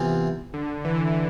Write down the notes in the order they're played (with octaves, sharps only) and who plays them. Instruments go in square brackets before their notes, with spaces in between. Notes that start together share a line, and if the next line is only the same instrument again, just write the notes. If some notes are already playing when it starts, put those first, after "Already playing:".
Already playing: [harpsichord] C3 E3 B3 F4
[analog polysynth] D3
E3
E3